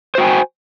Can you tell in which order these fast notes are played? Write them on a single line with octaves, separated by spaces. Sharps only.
C5 F#4 G5 G#5